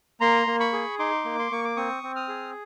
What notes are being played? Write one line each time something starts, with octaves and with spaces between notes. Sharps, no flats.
A#3 A#5 C6
A#3
B5 C#6
G#4
D#4 C6 D6
A#3
C6
A#3 C#6
D6
C4 C#6 D#6
C4
D#6 F6
G#4